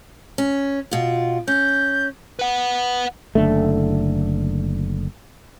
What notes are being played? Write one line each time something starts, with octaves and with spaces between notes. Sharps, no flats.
C#4
B2 F4
C#4 G6
B4 F#5
F#1 D3 A3